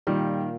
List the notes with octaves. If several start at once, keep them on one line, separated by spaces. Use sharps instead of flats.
A#2 D#3 G3